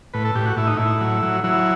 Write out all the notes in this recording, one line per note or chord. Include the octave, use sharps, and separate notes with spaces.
A2 B4
A4
A2 G4
F#4
A2 E4
D#4
A2 E4
F#3
F#3
F#3 E4